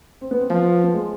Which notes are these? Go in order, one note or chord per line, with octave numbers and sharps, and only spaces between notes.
C4
B3
C4
F3 B3
B3
G#3